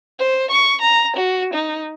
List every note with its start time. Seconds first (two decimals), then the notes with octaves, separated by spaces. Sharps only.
0.19 C5
0.51 C#6
0.82 A#5
1.16 F#4
1.54 D#4